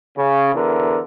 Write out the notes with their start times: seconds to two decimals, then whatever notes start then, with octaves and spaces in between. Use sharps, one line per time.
0.18 C#3
0.55 E2 D3 A#4